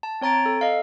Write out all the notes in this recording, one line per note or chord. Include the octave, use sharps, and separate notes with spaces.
A5
C4 C#5 A#5 A6 D7
A4
D#5 F5